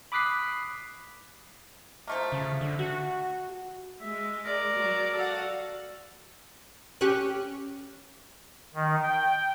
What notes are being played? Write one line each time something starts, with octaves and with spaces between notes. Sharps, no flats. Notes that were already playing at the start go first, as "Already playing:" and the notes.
B5 D6 D#6 F#6 B6 C7
F3 A3 A#3
C#3
D3
F#4
G#3 E5
A#4 D5
F#3
F#4 A4 F5 F#5
C#4 G4 C#6 F#6
D#3
G5